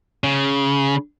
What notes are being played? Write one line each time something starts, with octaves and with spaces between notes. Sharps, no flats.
C#3